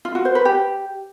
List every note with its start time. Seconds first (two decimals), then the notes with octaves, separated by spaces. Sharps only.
0.05 F4
0.15 F#4
0.25 C5
0.35 B4
0.45 G4